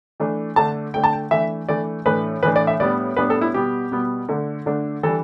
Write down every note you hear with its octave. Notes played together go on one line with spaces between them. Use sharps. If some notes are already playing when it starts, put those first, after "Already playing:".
E3 A3 D4
D3 A3 D4 A5
D3 A3 D4 G5
A5
G5
E3 A3 D4 E5
E3 A3 D4 D5
A2 E3 A3 D4 B4
A2 E3 A3 D4 B4
D5
E5
A2 G3 B3 D4 D5
A2 G3 B3 D4 B4
A4
E4
B2 G3 B3 G4
B2 G3 B3
D3 A3 D4
D3 A3 D4
E3 G3 D4 A4